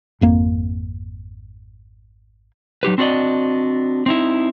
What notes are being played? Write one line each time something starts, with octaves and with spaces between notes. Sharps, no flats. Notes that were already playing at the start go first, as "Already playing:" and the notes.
G#1 F2 A#3
F#3 D#4 G4 B4
C4 D4 F#4 A#4 D5 D#5
C4 D#4 E4